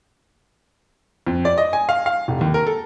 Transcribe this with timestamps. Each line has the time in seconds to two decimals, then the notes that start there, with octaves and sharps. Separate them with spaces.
1.27 F2
1.45 D5
1.58 D#5
1.73 G#5
1.89 F5
2.06 F5
2.28 F1
2.41 D#2
2.54 A#4
2.67 A4